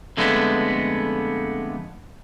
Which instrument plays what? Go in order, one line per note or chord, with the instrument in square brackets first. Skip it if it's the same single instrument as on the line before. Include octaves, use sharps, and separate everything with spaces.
[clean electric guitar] F2 D3 G#3 A3 B3